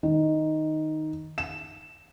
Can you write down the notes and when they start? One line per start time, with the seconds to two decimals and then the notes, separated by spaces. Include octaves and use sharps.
0.03 D#3
1.38 E7